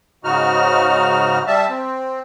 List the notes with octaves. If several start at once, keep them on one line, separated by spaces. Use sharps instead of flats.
G#2 C#3 D#4 F#4 F6
G3 E5 A5
C4